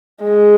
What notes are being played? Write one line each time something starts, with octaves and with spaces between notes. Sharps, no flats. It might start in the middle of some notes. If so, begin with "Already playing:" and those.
G#3